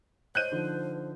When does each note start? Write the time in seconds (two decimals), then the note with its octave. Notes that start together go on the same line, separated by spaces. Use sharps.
0.35 C5 C#5 D#5 F#6 G6 D#7
0.52 D3 F3 D#4